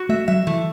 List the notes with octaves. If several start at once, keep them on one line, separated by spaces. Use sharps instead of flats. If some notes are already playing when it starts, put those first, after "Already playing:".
Already playing: F#4
A3 E5
F#3 E5
E3 A3